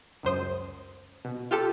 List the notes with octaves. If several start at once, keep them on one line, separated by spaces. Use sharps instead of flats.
C#2 F#2 C5 D#6
B2
F4 G4 A4